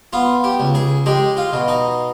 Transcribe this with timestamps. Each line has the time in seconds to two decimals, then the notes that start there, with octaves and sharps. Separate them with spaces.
0.13 B3 F4
0.44 G4
0.60 C#2
0.75 G#4
1.06 G#3 G4
1.37 F4
1.53 B2
1.68 D#4